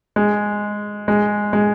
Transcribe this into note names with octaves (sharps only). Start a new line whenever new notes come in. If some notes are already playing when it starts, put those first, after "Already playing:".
G#3
G#3
G#3